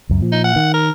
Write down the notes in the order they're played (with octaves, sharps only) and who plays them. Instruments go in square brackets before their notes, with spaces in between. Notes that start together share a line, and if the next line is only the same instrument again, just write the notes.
[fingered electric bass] C#2 F#2
A#2 F3
[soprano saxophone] D#4
F#5
[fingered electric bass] D#3
[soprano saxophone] A#4